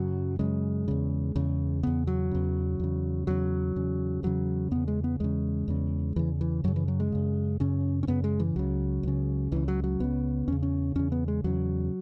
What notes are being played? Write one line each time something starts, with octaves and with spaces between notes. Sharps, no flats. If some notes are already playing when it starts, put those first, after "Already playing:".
Already playing: F#2 C#3 F#3
F#2 C#3 G#3
E2 C#3
E2 C#3
E2 C#3 B3
F#3
E2 C#3
E2 C#3
E2 C#3 F#3
E2 C#3
E2 C#3 F#3
E2 C#3 B3
G#3
B3
E2 C#3 G#3
E2 C#3
E2 C#3 E3
E3
F#2 C#3 F#3
E3
F#3
G#3
F#2 C#3
F#2 C#3 C#4
C#4
F#2 C#3 B3
G#3
E3
C#2 C#3 F#3
C#2 C#3
C#2 C#3 E3
F#3
F#3
C#2 C#3 B3
E2 C#3 C#4
C#4
E2 C#3 C#4
B3
G#3
E2 C#3 F#3